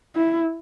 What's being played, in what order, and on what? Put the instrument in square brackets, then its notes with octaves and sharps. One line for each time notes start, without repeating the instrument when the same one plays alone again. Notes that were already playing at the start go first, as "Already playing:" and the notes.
[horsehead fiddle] E4